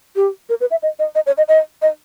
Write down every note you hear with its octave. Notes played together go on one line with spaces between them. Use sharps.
G4
A#4
B4
E5
D#5
D#5
D#5
C#5
D#5
D#5
D#5